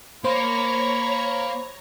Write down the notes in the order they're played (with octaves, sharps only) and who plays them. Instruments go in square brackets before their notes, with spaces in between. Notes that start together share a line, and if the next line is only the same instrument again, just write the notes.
[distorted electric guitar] A#3 [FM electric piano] C5 [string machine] C#5 A#5 C#6 [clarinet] B5